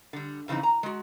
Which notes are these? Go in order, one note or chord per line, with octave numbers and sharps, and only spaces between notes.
D3 G3
F2 C#3 E3 C4 D#4
A#5
G#3 F#4